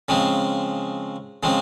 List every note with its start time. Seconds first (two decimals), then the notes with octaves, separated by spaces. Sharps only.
0.08 C#3 F3 G#3 C4
1.43 C#3 F3 G#3 C4